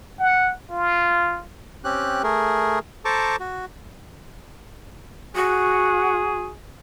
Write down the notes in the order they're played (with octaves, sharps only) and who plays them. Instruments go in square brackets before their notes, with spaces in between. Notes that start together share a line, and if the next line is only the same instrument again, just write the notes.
[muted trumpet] F#5
F4
[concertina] C4 C#4 G4 F#6
A3 G#4 A#4
A4 C5 A5 A#5 C#6 D6
F#4
[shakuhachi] F#4 [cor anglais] G#4